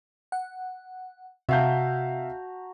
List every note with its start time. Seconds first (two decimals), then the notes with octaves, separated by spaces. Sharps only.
0.32 F#5
1.49 C3 F#4 E5 F5 A5 A#5 G6